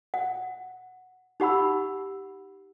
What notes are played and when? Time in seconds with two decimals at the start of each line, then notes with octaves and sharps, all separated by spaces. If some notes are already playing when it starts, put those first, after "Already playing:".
0.14 F#5
1.40 D#4 G4 F#5 B5 E6